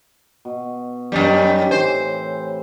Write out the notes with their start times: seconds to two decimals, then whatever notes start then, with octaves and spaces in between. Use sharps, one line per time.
0.45 B2
1.12 F#2 D#3 G3 C#4
1.71 A2 C3 E3 C5